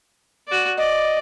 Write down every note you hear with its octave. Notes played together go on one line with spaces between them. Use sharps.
F#4 D5
D5 D#5